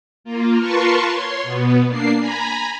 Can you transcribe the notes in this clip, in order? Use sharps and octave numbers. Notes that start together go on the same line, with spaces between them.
A#3 F4
F4 A#4 B4 A5 C6 C#6
C#5 C6
B2 B3
A#3 D4 C7
G#5 A#5 B5